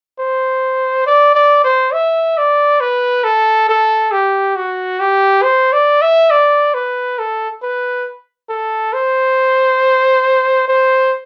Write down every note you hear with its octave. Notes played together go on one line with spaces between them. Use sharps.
C5
D5
D5
C5
E5
D5
B4
A4
A4
G4
F#4
G4
C5
D5
E5
D5
B4
A4
B4
A4
C5
C5